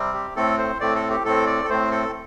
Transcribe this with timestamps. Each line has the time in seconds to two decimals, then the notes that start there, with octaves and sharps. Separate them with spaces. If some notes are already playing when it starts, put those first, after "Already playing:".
Already playing: C3 G3 C4
0.14 G4
0.36 A2 A3 C4 A4
0.58 C5
0.80 A2 A3 C4 D5
0.95 A4
1.10 G4
1.25 A2 A3 C4 A4
1.47 D5
1.64 A4
1.70 A2 A3 C4 C5
1.91 A4